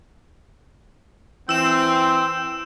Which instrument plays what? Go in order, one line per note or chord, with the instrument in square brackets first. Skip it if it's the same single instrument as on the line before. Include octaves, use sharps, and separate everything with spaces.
[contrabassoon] E3 [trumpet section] C4 [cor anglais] G5 [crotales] E6 E7